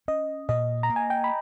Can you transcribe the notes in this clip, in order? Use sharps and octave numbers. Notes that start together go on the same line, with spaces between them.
C#4 D#5
A#2 D#5
A#5
A#3
G#5
G5
B5